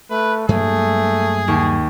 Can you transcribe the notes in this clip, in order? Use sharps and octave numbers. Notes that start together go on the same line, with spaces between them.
A3 B4
G2 F#3 A3 A#3 G#4
D#2 C#6